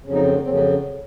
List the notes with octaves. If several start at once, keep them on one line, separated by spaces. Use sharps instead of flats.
F2 C#3 F#3 C#4
C4 D#4
C4
A#3
F2 C#3 F#3 C4
A#3 C#4